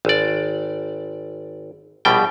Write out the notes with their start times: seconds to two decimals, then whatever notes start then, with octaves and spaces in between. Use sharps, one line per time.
0.05 G#1 D5
2.05 A#1 B2 G3 G5